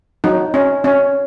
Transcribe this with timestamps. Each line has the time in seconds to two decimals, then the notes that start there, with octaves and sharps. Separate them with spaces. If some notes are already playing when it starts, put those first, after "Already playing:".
0.24 F#3 D#4
0.54 C#4
0.84 C#4